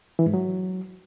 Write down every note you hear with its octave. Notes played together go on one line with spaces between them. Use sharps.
E3
G#2
F#3